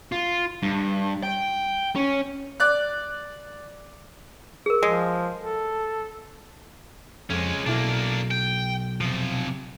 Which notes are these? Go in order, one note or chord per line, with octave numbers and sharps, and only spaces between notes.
F4
G2
G5
C#4
D5 F#6
G#4 A#4
F3 G#3
A4
F2 G#3 C#4
B1 A#3 D4 E4
G5
C3 F3